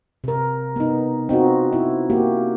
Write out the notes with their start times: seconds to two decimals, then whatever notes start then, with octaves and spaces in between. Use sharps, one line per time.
0.24 C3 A#4
0.76 B3 D#4
1.29 C4 D#4 F4 F#4
1.73 E4
2.10 A#3 F#4 G4